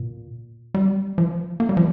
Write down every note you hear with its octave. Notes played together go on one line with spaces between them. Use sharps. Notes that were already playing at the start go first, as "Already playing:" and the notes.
Already playing: A#2
G3
F3
A#3
G3
F3